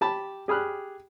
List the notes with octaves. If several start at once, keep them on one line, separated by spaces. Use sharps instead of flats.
G4 A5 B5
G4 G#4 B5 F6 F#6